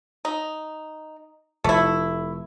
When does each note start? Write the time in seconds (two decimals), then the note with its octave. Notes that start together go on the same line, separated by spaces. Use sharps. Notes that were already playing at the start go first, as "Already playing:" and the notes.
0.25 D#4
1.64 F1 A3 E4